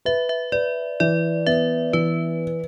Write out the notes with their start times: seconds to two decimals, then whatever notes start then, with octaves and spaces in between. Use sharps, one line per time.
0.05 B4 E5
0.29 E5
0.52 B4 D5
1.00 E3 D5
1.47 B3 E5
1.93 E3 B4